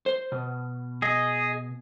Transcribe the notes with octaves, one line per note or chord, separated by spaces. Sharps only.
C5
B2
G#4 D#5